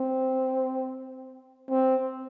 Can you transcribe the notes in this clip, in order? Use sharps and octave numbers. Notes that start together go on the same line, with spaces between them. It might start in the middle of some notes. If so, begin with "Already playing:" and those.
Already playing: C4
C4